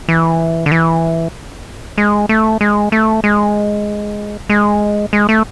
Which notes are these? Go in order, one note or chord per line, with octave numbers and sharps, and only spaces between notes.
E3
D3
E3
G#3
A3
G#3
A3
G#3
G#3
G#3
A3